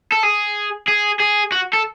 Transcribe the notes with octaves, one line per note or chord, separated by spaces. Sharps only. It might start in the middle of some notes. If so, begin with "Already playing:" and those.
A4
G#4
G#4
G#4
F#4
A4